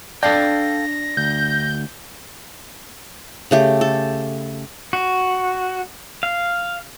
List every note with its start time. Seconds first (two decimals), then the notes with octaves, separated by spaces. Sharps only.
0.23 D4 A4 F5 G5 A#6
1.17 D2 G6
3.51 C#3 A3 G4
3.81 A4
4.93 F#4
6.23 F5